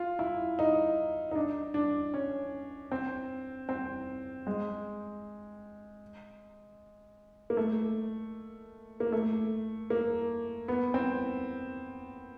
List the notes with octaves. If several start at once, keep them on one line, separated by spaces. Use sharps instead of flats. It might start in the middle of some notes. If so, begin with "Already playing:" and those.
Already playing: F4
E4
D#4
D#4
D4
D4
C#4
C4
C4
G#3
A#3
A3
A#3
A3
A#3
B3
C4